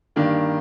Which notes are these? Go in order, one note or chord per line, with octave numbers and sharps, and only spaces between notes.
G2 D#3 A#3 D4